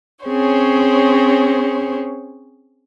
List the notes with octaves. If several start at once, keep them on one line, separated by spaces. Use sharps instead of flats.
C4 C#4 G#4 C5 C#5